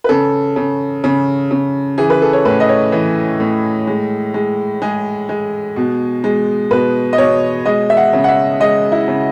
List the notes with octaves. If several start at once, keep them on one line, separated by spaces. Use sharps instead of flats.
B4
C#3 A4
C#3
C#3
C#3
E3 G#4
B4
A4
C#5
A2 B4
D#5
C#5
E3
A2
G#3
G#3
G#3 G#4
G#3
B2
G#3
B2 B4
D#5
B2 C#5
G#3 D#5
E5
F#5
C#3
F#5
E5
G#3 D#5
E4
C#3